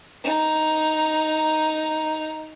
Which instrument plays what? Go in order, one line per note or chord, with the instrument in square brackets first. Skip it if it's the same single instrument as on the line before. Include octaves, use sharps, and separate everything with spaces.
[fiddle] D#4 A#5